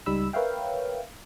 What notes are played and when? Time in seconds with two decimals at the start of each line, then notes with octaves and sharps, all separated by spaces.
0.06 C#2 G3 D#4 B5 E6
0.33 A#4 B4 C#5 E5 F5 G5